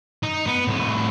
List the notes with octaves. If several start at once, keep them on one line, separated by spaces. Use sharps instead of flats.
D#4
B3
C2 A2